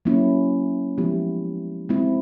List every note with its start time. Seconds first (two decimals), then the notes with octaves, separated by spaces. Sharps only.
0.05 F#3 A#3 C#4 E4
0.98 F3 G#3 B3 E4 G4
1.89 G#3 C4 E4